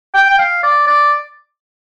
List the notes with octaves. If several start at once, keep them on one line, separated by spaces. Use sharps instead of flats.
G5
G5
F5
D5
D5